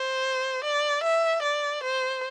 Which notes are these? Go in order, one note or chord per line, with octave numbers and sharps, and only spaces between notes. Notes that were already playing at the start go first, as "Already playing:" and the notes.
Already playing: C5
D5
E5
D5
C5